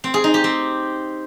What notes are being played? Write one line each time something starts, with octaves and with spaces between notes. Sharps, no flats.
C4
G#4
D#4
G4
C4